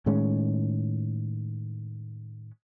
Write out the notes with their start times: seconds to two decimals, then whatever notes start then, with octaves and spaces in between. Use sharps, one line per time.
0.06 A2 D#3 G#3 C#4